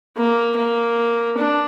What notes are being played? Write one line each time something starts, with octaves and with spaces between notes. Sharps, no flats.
A#3
A#3
D4